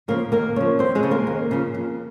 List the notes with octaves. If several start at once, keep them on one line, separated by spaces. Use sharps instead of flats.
C#3 F3 A#3 A#4
D#2 A#3 A#4
C#3 F3 C#4 C#5
D#2 C4 C5
G#3 G#4
C#3 F3
A#3 A#4
D#2
C#3 F3
F2